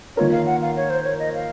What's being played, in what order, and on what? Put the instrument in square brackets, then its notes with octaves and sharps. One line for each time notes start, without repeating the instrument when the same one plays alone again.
[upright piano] D#3 A#3 F4 A#4 [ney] C#5
[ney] F5
F#5
F5
C#5
C5
C#5
D#5
F5